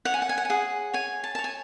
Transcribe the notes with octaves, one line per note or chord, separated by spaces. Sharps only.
C#5 F#5
G#5
F#5
G#5
F#5
G#5
G#4 F#5
C#5 G#5
A5
A5
C#5
G#5